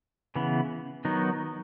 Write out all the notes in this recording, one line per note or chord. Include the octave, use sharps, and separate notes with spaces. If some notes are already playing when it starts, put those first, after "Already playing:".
C#3 E3 B3
D#3 F#3 B3 D#4